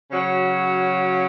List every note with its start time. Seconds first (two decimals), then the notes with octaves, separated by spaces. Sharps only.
0.10 C#3 F#3 C#4 F#4 C#5